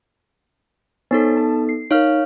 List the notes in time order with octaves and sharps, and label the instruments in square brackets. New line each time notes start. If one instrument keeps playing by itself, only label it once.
[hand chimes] B3 D#4 A4 [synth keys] C5 C#5 G#5
[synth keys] A5
C7
[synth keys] D#4 A#4 [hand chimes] C#5 F5 F6